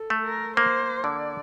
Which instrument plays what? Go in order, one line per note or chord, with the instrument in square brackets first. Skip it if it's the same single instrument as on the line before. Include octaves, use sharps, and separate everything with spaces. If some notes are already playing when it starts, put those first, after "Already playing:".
Already playing: [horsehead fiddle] A4
[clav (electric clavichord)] A3
[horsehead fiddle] A#4
[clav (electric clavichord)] A#3 [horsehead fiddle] C5
[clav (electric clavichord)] D3 [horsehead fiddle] D5